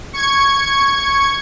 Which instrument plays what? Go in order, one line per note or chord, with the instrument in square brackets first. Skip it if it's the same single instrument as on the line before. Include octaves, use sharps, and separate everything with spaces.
[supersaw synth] C#6 G#6 C#7